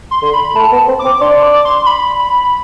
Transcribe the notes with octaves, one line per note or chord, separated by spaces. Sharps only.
C6
D3
B5
A3 A5
B3
C4
D6
C4
D4 C6
D6
C6
B5